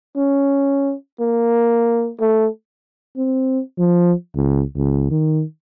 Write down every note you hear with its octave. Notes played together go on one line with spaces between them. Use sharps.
C#4
A#3
A3
C4
F3
C#2
C#2
D#3